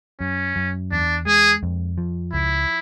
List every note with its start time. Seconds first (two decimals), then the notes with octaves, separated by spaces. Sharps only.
0.20 F#2 C#4
0.56 F#2
0.91 E2 D4
1.26 G#3 G#4
1.63 F2
1.98 F3
2.33 C#2 E4